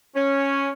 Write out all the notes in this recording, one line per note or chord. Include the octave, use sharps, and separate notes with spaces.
C#4